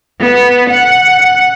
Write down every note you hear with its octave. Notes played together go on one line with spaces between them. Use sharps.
B3
F#5